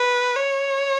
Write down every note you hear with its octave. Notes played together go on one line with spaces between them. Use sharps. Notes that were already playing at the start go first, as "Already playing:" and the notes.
Already playing: B4
C#5